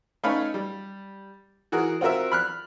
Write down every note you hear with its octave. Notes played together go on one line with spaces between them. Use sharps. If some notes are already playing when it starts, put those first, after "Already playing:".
A3 C#4 D#4 B4 C#5 F5
G3
E3 F#4 G#4 A#4
C4 F4 F#4 A#4 E5
B5 F6 F#6